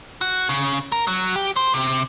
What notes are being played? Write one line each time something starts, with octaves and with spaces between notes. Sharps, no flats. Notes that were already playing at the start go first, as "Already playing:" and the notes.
F#4
C#3
A#4
F#3
G4
C5
C3